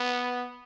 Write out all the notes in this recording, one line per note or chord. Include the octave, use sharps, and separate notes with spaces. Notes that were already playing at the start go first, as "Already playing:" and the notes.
Already playing: B3